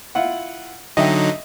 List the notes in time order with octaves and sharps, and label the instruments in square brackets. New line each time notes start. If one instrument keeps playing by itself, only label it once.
[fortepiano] E4 F4 F#5
[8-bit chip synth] D3 F#3 D#4 [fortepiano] D#5 E5 G5